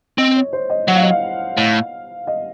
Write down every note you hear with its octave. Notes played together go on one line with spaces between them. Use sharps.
C4 D#5
C#5
C5
D#5
F#3 F#5
F5
D#5
F5
A2
D#5